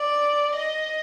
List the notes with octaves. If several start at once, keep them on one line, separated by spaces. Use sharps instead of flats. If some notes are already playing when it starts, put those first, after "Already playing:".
Already playing: D5
D#5